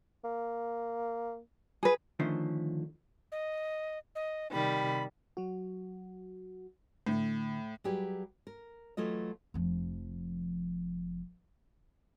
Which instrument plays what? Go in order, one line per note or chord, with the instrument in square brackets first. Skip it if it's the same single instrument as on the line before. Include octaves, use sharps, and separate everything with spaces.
[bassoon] A#3
[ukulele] G#4 B4
[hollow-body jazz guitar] D3 D#3 F3 A3 C#4 C5
[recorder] D#5
D#5
[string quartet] C3 D#3 G3 [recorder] B5
[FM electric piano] F#3 F#4
[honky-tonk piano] A2 [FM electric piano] D3
[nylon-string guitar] F#3 G3 G4 G#4 B4
A#4
E3 F#3 A3 F4 D#5
[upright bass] F1 F3